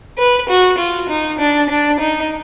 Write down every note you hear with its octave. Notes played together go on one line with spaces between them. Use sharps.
B4
F#4
F4
D#4
D4
D4
D#4